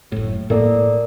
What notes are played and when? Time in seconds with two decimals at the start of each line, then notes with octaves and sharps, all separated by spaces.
0.12 F#1 A2
0.50 A2 A#3 A4 A#4 D5